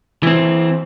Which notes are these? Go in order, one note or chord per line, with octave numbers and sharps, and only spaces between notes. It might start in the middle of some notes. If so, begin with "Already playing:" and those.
E3 C4